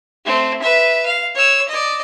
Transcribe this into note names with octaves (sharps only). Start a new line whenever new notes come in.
A3 C4
B4 E5
F5
C#5 E6
D5 D#5